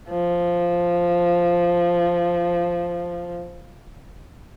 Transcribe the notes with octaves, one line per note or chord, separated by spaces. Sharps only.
F3